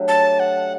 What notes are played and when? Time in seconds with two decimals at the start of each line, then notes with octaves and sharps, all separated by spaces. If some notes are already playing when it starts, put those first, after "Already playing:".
Already playing: F#3 A3 D4 G4
0.08 A5
0.40 F#5